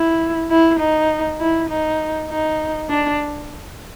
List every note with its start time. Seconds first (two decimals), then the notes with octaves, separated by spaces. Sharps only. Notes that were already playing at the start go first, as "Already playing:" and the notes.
Already playing: E4
0.50 E4
0.80 D#4
1.40 E4
1.70 D#4
2.30 D#4
2.90 D4